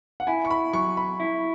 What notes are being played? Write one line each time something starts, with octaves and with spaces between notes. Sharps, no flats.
F#5
E4 G#5
C#6
B5
F#3 C#6
B5
E4